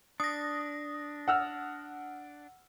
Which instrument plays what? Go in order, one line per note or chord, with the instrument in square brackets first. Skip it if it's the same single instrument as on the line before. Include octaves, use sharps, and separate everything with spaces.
[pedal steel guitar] D4 [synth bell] D#6 A#6
[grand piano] F#5 E6 F6